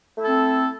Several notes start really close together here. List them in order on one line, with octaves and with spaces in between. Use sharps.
A3 E4 A4 C4